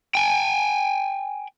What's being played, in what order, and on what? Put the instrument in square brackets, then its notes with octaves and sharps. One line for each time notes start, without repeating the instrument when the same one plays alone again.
[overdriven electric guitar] G5 G#5